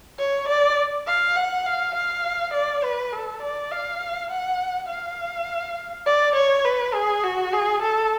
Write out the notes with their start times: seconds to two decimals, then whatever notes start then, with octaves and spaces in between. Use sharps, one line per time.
0.19 C#5
0.48 D5
1.07 F5
1.36 F#5
1.66 F5
1.96 F5
2.54 D5
2.84 B4
3.13 A4
3.42 D5
3.71 F5
4.30 F#5
4.89 F5
6.07 D5
6.36 C#5
6.65 B4
6.94 G#4
7.24 F#4
7.54 G#4
7.83 A4